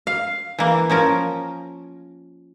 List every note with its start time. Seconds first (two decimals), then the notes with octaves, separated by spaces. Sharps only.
0.07 F5
0.59 E3 A#3
0.90 F3 C#4 A#4